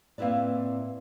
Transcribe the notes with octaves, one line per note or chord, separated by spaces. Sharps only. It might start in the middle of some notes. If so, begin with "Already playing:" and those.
A2 A#3 C4 E4 B4 D5